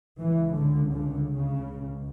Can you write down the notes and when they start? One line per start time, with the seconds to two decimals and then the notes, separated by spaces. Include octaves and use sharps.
0.20 C#2 C#3 E3
0.56 D3
0.93 D3
1.30 C#3
1.67 C#2 B2